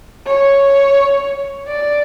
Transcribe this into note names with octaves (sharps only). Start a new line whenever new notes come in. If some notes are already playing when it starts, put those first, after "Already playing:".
C#5
D5